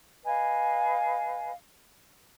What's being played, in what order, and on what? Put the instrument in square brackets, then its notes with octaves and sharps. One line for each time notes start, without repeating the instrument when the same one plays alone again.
[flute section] B4 D#5 F5 G#5